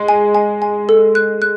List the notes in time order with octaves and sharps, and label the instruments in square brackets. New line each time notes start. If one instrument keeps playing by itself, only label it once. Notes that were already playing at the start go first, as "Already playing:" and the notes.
Already playing: [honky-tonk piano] G#3
[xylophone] G#5
G#5
G#5
A4
F#6
F#6